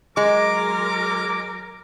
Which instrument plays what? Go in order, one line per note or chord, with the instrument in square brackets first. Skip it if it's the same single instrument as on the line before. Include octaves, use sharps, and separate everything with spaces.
[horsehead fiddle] F#3 A#4 [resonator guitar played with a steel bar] G#3 [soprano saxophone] D6